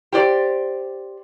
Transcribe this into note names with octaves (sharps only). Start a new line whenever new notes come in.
G4 C5 D5